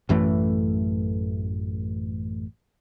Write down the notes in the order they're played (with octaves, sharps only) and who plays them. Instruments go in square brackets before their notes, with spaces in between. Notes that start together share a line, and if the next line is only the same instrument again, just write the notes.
[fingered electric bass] A1 F#2 E3 A3